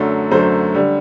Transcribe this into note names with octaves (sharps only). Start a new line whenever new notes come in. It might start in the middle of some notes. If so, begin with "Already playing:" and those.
Already playing: F#2 D3 F#3 A3
F#2 D3 F#3 A3 C5
D3 G3